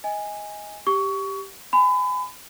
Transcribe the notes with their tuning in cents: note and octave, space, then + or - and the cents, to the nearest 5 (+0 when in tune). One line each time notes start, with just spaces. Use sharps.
D#5 +25 G#5 -10
G4 +0 C#6 +25
G#5 +0 B5 +35